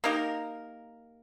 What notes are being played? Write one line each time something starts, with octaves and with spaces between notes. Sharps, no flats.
A#3 D#4 G4 A#4